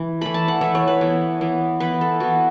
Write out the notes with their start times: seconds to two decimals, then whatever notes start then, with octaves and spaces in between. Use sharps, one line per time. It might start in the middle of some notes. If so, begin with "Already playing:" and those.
Already playing: E3
0.21 E3 A3 B5
0.34 A5
0.48 F#5
0.61 E3 A3 E5
0.75 C#5
0.88 B4
1.01 E3 B3
1.41 E3 B3
1.80 E3 B3 B4
2.01 A4
2.20 E3 B3 F#4